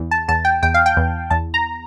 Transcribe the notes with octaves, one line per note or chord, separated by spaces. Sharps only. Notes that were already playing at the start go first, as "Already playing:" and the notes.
Already playing: E2
A5
E2 A5
G5
E2 G5
F5
G5
E2
E2 A5
A#5